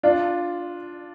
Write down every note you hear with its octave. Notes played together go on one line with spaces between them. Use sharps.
D4 F4